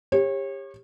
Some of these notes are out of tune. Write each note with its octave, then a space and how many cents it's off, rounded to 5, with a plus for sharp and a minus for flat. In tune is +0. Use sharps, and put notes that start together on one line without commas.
G4 +30 C#5 -30